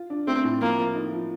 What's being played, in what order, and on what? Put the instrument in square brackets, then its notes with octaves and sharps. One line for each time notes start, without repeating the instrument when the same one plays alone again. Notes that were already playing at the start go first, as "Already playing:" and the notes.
Already playing: [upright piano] F4
D4
[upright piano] A3 [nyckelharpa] C4
[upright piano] A2
[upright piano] F3 [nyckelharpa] A#3
[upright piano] F3
D#4
F3